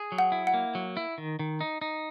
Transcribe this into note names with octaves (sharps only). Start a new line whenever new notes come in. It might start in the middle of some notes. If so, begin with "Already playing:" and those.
Already playing: G#4
F#3
F#5
E4
F#5
A#3
F#3
E4
D#3
D#3
D#4
D#4